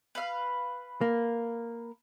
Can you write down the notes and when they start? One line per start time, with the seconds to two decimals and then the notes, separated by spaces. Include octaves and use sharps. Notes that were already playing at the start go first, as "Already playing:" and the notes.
0.15 B4 F5
1.01 A#3